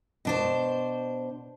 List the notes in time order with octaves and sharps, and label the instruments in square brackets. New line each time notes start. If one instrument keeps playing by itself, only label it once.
[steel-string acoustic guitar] B2 D4 C5